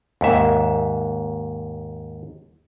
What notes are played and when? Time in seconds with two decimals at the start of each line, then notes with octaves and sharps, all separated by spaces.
0.21 D#2 G#2 E5